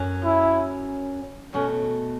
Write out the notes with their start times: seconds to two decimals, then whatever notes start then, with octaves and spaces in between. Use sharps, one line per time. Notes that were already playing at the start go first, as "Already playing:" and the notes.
Already playing: F#2 F#3 C#4
0.24 E4
1.54 B2 A3 C#4 F#4